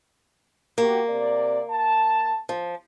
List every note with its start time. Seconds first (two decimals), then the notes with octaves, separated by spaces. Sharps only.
0.78 A#3 F#4 G4
1.09 C3 D5
1.70 A5
2.49 F3